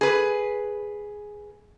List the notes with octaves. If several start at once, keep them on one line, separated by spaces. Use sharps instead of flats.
G#4 B4